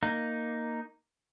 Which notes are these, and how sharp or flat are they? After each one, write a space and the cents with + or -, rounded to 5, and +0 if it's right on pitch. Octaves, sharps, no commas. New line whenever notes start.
A#3 +0 D#4 +0